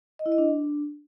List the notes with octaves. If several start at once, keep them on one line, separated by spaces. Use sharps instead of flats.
D#5
E4
D#5
D4